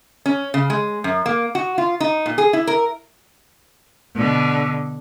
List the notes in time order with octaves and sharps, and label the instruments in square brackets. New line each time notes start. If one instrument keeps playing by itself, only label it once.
[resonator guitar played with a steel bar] C#4
C#3
G#3
F#2
A#3
F#4
F4
D#4
A#2
G#4
E4
A#4
[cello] B2 D3